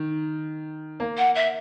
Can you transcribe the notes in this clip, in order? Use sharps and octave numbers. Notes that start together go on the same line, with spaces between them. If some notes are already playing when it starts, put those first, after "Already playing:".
Already playing: D#3
A#3
F#5
E5